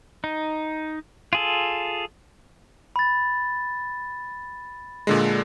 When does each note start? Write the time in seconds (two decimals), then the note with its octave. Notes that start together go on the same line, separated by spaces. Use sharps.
0.24 D#4
1.33 F4 G#4 A4
2.96 B5 A6
5.07 A#2 D3 G#3